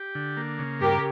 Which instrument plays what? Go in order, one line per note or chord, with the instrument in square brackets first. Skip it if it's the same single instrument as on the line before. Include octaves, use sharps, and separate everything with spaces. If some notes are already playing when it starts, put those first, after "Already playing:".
Already playing: [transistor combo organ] G4
D3
A#3
C#3
[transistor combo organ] G2 [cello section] G4 A#4